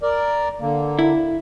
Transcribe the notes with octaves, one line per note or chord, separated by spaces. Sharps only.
A#4 D5
D3 A#3
E4